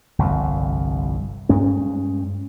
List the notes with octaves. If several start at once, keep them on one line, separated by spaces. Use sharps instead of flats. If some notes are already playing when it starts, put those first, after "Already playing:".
G1 C2 F2
G2 G#3 C#4